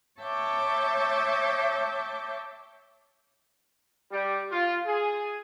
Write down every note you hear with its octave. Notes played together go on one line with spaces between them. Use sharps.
C#5 E5 G5 A5 D6
G3
F4
G#4